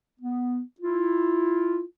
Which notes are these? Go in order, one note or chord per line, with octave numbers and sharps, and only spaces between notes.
B3
E4 F4